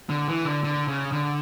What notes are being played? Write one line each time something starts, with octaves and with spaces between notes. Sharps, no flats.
D3
E3
D3
D3
C#3
D3